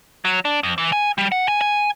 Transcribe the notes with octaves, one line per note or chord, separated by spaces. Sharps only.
F#3
D4
F2
E3
G#5
G3
F#5
G#5
G#5